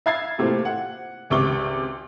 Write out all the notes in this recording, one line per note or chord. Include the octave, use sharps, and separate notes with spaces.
E5 F5 B5 G#6 A6 C7
A2 C3 A3 A#3 C4 F4
F#5
G#1 C#2 C3 C#6 D6 G7